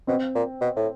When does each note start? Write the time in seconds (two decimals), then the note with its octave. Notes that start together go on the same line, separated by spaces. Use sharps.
0.07 B2 C4
0.35 A#2
0.61 B2
0.76 A2